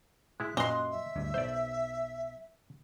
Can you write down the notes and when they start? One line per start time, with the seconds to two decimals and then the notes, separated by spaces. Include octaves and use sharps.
0.40 G#3 E4 F#6
0.57 F#2 A#2 D#5 C6
0.91 E5
1.16 D1 D2 G2
1.34 B1 C5 D5